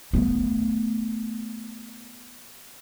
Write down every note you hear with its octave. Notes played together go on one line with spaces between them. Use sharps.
A3 B3